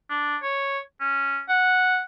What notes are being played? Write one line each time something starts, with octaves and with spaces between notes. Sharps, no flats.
D4
C#5
C#4
F#5